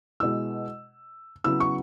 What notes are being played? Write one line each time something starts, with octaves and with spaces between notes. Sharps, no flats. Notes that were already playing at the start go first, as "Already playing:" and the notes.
B2 G#3 E4 E6
C#3 F#3 B3 E4 E6
C#6